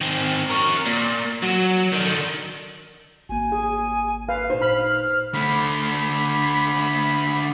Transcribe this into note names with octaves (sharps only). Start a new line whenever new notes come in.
D#3 C4
A#4 C#5
A#2
F#3
D3 D#3
G#1 A#3 G#5
G#4
B4 F5
A#2 D#4 C5
B5 F6
D3 A3 B5